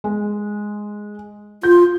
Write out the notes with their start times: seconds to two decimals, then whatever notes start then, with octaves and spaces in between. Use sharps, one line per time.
0.04 G#3
1.63 F4 G6